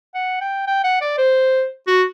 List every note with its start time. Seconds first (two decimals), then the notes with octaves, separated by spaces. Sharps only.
0.15 F#5
0.41 G5
0.67 G5
0.84 F#5
1.01 D5
1.18 C5
1.87 F#4